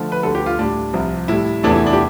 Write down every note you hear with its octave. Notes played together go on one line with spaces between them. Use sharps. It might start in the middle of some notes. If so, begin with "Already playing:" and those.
Already playing: D3 F3 A3
B4
D2 D3 G3 A4
G4
F4
A2 G3 D4
C2 C3 F3
A2 G3 E4
E2 C3 E3 A3 D4
E4
D4
G4